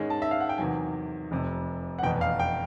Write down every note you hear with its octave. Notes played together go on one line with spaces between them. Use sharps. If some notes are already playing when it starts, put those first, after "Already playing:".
Already playing: G#2 D#3 G#3 C#4
A5
E5
F5
F#5
G5
E2 C3 D#3 F#3 G#5
F1 F2 C3
F#5
F1 E2 B2 G5
F5
G5